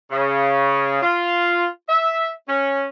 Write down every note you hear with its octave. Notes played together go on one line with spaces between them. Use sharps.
C#3
F4
E5
C#4